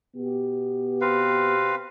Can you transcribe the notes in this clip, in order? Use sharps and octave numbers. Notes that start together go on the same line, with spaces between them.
B2 B3 G4
C4 B4 F5